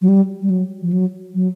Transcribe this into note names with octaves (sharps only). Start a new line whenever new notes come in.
F#3
G3
G3
F#3
F3
F#3
F#3